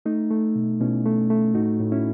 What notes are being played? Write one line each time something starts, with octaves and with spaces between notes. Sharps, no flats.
A3 D#4
A3
B2
B2 C#4 E4
A3
A3
A2 D#4 F#4
A2
C#4 E4